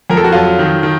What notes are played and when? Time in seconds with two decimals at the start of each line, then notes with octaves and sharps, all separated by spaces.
0.10 F2 A#4
0.17 A4
0.24 F#4
0.32 F#3 F4 A4
0.59 D#3
0.83 D#3